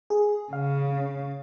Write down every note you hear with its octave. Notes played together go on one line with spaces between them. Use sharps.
G#4
C#3 F5